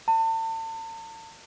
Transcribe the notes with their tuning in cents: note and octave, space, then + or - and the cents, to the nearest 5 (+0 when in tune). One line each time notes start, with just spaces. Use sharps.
A5 +40